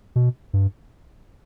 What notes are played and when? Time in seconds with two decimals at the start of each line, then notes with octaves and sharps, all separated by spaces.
0.16 B2
0.53 G2